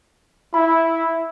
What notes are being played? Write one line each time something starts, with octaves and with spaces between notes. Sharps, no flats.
E4 B5